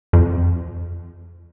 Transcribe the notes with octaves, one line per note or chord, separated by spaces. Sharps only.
F2